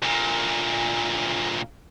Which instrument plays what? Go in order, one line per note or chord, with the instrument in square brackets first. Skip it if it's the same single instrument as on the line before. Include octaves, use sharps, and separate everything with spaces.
[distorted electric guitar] D2 A#2